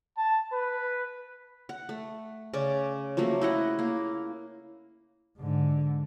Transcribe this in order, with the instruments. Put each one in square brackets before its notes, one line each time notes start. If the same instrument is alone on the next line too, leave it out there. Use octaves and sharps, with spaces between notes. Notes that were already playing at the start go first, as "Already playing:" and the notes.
[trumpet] A5
B4
[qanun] F#5
A3
C#3 C#4 D5
F3 F#3 A3 A#3
E4 D#5 F#5
A#3
[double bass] G#2 D3